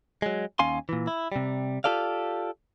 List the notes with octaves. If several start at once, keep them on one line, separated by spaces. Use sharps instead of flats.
F#3 G#3
D#2 C#4 F5 G#5 C6
A#2 E3
E4
C3 G3
F4 G4 A4 D5 F5